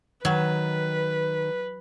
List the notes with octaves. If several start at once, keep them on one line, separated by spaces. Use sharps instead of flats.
D#3 F#3 B4